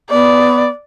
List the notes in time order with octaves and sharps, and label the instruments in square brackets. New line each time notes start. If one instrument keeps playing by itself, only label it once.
[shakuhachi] B3 [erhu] D5